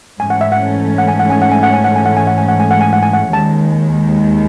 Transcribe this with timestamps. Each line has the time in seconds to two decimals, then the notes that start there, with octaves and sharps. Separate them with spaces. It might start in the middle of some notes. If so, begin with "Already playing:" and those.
0.19 G#2 E3 A3 C#4 G#5
0.30 F#5
0.41 E5
0.52 F#5
0.98 F#5
1.08 G#5
1.19 F#5
1.30 G#5
1.42 F#5
1.52 G#5
1.63 F#5
1.74 G#5
1.84 F#5
1.96 G#5
2.06 F#5
2.17 G#5
2.27 F#5
2.38 G#5
2.48 F#5
2.60 G#5
2.71 F#5
2.81 G#5
2.93 F#5
3.03 G#5
3.13 F#5
3.33 D#2 D#3 G#3 A5